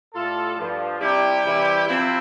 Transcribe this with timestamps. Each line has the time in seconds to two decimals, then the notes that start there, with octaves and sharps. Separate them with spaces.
0.14 A2 G3 F4 A4
0.57 G2 F3
1.01 C3 G3 E4 G4
1.44 C3 E3 G3
1.87 C3 F3 C4 E4